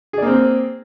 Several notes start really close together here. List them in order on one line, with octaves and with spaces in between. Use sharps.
G#4 D5 A#3 C4